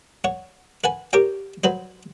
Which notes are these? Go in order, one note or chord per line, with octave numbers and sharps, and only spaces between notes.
C#5 F#5
B4 F#5 G#5
G4 A#4 C#5 G5
F#3 B4 C5